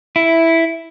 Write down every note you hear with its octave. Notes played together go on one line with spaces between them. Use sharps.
E4